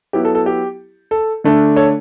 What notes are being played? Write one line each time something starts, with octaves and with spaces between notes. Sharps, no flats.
F#3 B3 E4 G4
A4
A4
G4
A4
D3 A3 D4
A4 C#5